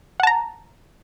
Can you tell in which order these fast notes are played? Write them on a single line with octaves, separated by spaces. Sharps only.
F#5 A5 A#5